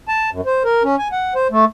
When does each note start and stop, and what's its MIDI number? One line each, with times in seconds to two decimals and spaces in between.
0.08 0.30 81
0.32 0.41 42
0.46 0.63 72
0.64 0.83 70
0.84 0.96 61
0.99 1.08 80
1.12 1.34 78
1.35 1.47 72
1.51 1.65 57